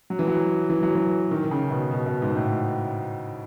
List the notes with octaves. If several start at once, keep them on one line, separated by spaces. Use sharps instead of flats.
F#3
E3
F#3
E3
F#3
E3
D#3
D#3
C#3
B2
B2
B2
G#2
A2